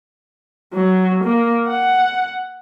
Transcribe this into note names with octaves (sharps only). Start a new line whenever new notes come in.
F#3
A#3
F#5